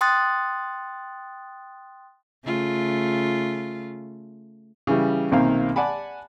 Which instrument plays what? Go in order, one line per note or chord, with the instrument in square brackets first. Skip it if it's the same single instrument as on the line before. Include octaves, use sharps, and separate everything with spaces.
[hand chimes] G5 C6 D#6 F#6 A6
[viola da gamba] C#3 A3 F4
[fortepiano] C#3 E3 G3
B1 C3 D#3 A#3 C4 F5
D5 F#5 G#5 A5 B5